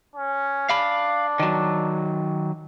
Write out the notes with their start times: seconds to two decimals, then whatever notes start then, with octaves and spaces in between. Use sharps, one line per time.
0.16 C#4
0.69 D4 F5 B5
1.40 D#3 F#3